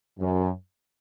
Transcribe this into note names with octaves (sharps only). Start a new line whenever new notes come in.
F#2